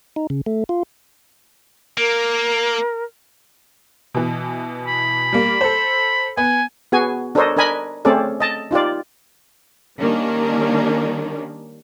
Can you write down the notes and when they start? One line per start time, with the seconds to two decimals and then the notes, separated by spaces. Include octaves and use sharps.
0.16 D#4
0.30 C#3
0.46 A3
0.69 F4
1.97 A#3 A#4
4.14 B2 E3
4.88 B5
5.33 G3 A#3
5.61 A4 C5
6.37 B3 G#5
6.92 B3 F#4 G#4 G#5
7.35 D4 A4 A#4 C5 C#5 D#5
7.57 D4 A#4 D#5 G#5 B5
8.05 A3 C4 C#4 G#4 A4 D5
8.40 D#5 A5
8.71 D#4 F4 G4 D5
9.99 D#3 G3 A#3 C#4 D4